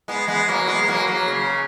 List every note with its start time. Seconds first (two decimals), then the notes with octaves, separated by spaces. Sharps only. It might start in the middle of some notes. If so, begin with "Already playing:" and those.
0.08 G#3 B3
0.28 G#3 B3
0.48 F#3 A#3
0.67 G#3 B3
0.83 B3
0.88 F#3 A#3
1.07 F#3 A#3
1.28 C#3